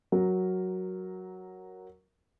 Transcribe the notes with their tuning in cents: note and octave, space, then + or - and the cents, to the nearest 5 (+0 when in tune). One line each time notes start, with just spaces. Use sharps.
F#3 +0 A#4 +0